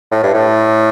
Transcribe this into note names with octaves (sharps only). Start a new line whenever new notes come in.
A2
G2
A2